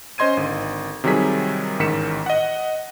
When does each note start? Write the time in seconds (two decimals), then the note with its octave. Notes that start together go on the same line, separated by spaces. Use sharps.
0.18 C#4 C5 D#5 C6 G#6 D#7
0.37 G#1 D3
1.04 C3 D#3 F#3 G3 G#4 B6
1.79 A1 G#2 D#3 B6 C#7 E7
2.26 D#5 F#5